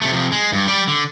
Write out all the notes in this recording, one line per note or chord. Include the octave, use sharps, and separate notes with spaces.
C3 A3
F2 C3
G#3
G2
G3 D5
D3